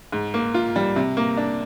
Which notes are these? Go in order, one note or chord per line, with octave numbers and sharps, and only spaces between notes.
G#2
A#3
F4
G3
C3
A#3
D4